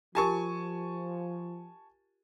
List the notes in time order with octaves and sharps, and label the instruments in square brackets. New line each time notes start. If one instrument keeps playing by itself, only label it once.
[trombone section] F3 [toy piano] F4 G4 A#4 [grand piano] G#5 A5 C#6